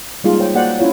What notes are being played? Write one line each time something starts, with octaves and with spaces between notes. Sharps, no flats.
G3 G#3 A#3 D#4 F4 G#4
C5 C#5 G5
A#3 F#4 C5 D5 F#5 G5
C#4 E4 F4 C#5